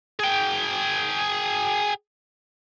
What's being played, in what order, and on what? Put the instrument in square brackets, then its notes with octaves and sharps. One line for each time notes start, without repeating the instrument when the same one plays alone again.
[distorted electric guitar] G#4 G5